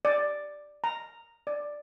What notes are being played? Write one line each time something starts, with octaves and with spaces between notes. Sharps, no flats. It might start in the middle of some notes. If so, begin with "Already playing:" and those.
D5
A#5
D5